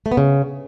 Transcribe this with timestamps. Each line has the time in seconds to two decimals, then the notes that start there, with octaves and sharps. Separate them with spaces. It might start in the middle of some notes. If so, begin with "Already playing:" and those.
0.06 A3
0.12 B3
0.17 C#3